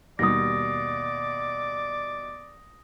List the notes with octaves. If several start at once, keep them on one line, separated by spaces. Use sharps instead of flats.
D#2 B2 G3 D5 D#6 A#6